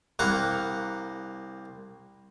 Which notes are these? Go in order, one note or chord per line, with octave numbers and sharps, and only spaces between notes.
C2 A#3 F#5 A#5